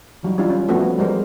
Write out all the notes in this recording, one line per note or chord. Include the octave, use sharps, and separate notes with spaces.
E3 F#3 G3 D#4
E3 G3 C#4 D4 E4 F4
C#4
F3 A3 B3 C4 D4 F#4
B3
F3 G3 G#3 A#4 C5